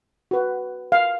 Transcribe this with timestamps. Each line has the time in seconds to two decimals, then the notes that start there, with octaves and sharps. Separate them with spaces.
0.31 F#4 B4
0.92 F5